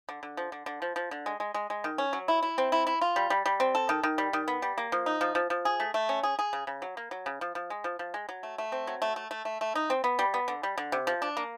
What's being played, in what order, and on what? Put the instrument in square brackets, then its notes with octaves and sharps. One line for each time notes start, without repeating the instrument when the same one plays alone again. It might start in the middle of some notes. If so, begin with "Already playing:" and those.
[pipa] D3
D3
F3
D3
D3
F3
F3
D3
G#3
G#3
G#3
G#3
D#3
C#4
F#3
E4
E4
C4
E4
E4
F4
G3
G3
G3
C4
A4
D#3
D#3
G3
D#3
B3
G3
A#3
F3
D#4
F3
F3
F3
G#4
A3
A3
C#4
G#4
G#4
C#3
C#3
F#3
A#3
F#3
C#3
F3
F3
G#3
F3
F3
G#3
F#3
A3
A3
C4
F#3
A3
A3
A3
A3
A3
D#4
C4
B3
G3
B3
D3
G3
D3
C3
F3
D4
A#3